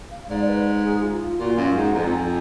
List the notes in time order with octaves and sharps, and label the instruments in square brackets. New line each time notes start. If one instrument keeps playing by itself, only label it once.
[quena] F5
[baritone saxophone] G#2 [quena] D5
[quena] B4
G#4
F4
F4
[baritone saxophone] A#2 [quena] F#4
[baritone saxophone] F#2 [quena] F5
[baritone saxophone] G#2 [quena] F#5
[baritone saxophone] F2 [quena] A#5
[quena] G#5